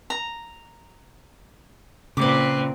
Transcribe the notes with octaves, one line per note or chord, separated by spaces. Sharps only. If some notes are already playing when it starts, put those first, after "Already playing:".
A#5
A#2 C#3 C4 B4 D6